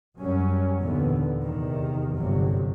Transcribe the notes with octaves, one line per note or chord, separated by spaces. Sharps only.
F#2 F#3 G3 C#4
D#2 A#2 D3 E3 B3
E2 C3 D#3
G1 C3 F#3